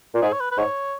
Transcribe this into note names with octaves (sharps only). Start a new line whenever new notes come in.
A#2
G#2 G#4
C#5
B4
B4
G#2 C#5